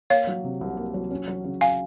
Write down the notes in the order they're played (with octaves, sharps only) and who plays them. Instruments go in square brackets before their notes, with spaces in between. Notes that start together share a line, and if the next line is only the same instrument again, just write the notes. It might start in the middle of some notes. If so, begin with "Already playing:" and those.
[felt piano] A#3 [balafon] C#5 F5
[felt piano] F#3
C3
C2
A#3
F#3
C#4
F#3
C#3
[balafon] F5 G#5